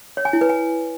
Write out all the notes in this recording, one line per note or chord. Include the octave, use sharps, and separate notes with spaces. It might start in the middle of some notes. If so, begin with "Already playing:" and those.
C#5
G#5
E4
B4
G#5